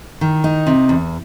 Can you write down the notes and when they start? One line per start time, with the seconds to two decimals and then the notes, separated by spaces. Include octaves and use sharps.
0.21 D#3
0.44 D#4
0.67 C3
0.89 E2